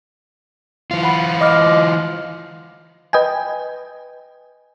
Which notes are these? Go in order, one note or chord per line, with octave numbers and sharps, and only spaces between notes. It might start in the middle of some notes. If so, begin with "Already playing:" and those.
E3 F4
F#5 B5
D#5 D6 F6
B4 D#5 G5 G#5